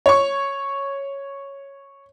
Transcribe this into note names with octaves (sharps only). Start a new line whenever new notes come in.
C#5 C#6